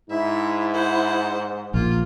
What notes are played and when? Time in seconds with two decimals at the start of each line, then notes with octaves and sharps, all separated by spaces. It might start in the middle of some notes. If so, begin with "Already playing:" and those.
0.10 G#2 E4 E5
0.74 C5 F#5
1.74 A#1 A#3 F4